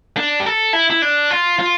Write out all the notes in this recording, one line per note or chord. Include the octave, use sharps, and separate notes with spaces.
D4
G4
A4
E4
E4
D4
F4
F4